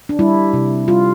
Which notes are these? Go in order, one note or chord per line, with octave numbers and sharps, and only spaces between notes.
D4
G3 E4
C3
G3 F4